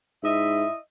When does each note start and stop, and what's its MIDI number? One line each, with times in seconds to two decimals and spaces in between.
0.23 0.65 44
0.23 0.76 64
0.23 0.76 75
0.23 0.76 76